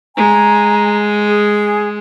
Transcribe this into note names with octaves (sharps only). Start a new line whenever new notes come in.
G#3 G#5 A#5
G#4